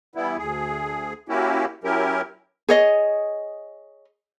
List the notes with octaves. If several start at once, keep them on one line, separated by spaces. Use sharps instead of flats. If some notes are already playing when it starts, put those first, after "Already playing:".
E3 G3 B3 E4
D2 G#4
A#3 C#4 E4 F#4 G4
F#3 C#4 E4 G4 A#4
G#4 C#5 D#5